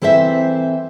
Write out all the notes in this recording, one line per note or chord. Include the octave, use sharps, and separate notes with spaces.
E3 C4 A4 C5 E5